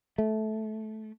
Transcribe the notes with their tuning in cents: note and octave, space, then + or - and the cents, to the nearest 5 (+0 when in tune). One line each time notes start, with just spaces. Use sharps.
A3 -15